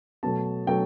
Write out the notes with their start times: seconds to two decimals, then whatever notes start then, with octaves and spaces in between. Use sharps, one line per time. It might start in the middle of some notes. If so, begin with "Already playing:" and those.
0.23 B2 F#3 A3 A5
0.67 B2 F#3 A3 G5